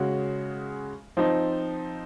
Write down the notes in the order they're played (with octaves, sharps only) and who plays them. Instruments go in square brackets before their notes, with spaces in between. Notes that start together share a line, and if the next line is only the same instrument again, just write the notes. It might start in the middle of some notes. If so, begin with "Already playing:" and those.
Already playing: [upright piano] C#3 G#3 C#4 F#4
F3 C4 D#4